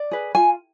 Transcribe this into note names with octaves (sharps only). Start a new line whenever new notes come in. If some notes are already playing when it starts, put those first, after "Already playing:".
Already playing: D5
G#4 B4
F4 G#5